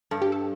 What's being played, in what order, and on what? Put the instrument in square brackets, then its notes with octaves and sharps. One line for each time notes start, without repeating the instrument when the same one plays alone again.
[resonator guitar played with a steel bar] G2 [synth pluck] A4
[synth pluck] G4
A4